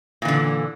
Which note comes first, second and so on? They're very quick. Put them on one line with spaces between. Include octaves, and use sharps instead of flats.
A#2 E3 D3